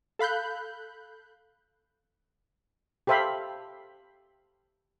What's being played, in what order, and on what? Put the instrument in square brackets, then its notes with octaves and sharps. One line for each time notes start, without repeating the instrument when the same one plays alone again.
[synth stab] A4 F5 B5 F#6 G6
[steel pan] G4 A4 C5 E5 F5 B5